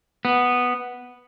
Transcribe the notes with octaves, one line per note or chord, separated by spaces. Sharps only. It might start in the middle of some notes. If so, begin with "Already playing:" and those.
B3